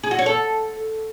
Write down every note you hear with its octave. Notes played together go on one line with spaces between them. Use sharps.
G#4
F#4
C#5
A4